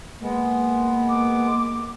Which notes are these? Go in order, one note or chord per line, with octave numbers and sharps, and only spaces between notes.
G#3 A#3 B3
D6